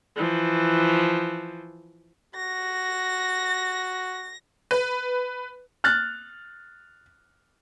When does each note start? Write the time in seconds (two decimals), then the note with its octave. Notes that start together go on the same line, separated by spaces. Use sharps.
0.16 E3 F3
2.35 F#4 A#6
4.71 B4
5.84 F6 F#6 A6